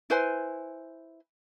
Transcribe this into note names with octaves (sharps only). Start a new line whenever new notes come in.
E4 B4 C5 G#5